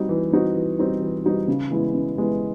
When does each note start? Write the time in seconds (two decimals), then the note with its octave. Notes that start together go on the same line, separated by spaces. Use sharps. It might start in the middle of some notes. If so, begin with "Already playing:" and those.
Already playing: G3 C4 D#4 F#4
0.09 E3
0.32 G3 C4 D#4 F#4
0.56 E3
0.78 G3 C4 D#4 F#4
1.01 E3
1.25 G3 C4 D#4 F#4
1.48 C#3
1.71 E3 G#3 B3 E4
1.94 C#3
2.17 E3 G#3 B3 E4